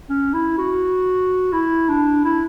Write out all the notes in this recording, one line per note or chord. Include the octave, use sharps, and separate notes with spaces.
C#4
E4
F#4
E4
D4
E4